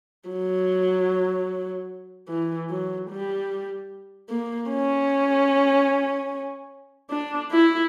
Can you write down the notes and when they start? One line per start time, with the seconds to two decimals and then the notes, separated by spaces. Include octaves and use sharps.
0.29 F#3
2.29 E3
2.70 F#3
3.10 G3
4.29 A#3
4.71 C#4
7.10 D4
7.51 E4